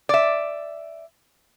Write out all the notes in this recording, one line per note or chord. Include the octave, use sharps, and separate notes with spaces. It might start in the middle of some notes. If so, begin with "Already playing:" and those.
D5 E5